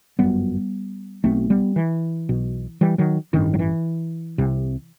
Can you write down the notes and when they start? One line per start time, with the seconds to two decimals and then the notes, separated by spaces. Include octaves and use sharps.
0.19 G1 F#2 G3 B3
1.24 B1 B2 A3 C4
1.50 G3 B3
1.76 E3
2.29 B1 B2
2.81 E3 G3
2.98 D#3 F#3
3.33 A1 G2 D#3
3.54 F#3
3.59 E3
4.38 C2 C3